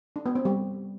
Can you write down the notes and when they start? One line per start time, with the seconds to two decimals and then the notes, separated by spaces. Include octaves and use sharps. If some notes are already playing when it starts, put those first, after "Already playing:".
0.16 D4
0.26 B3
0.35 C4
0.45 G3